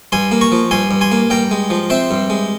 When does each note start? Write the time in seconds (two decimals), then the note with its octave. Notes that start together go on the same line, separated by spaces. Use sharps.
0.12 G2 G#5 C6
0.32 A#3
0.41 A#5 C#6
0.52 F3
0.71 G2 G#5 C6
0.91 G2
1.01 G#5 C6
1.12 A#3
1.30 G2 G5 A#5
1.51 G#3
1.70 F3
1.90 C4 C5 E5
2.11 G2
2.30 G#3